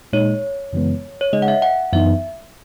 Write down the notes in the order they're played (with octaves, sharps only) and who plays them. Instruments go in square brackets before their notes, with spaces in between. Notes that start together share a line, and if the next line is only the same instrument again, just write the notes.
[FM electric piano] A#2 G#3 D#4 [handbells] C#5
[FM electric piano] F#2 C#3 E3 G#3 B3
[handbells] C#5
[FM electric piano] C#3 G#3 D#4 G#4 [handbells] D#5
[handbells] F#5
E5
F#5
[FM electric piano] F#2 E3 B3 D#4 [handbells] E5